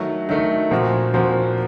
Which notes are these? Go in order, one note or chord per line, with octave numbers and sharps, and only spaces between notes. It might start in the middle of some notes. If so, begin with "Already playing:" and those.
Already playing: D#3 F#3 A3
D#3 F#3 A3
A#2 F3 C4 F#4 A#4
A#2 F3 C4 F#4 A#4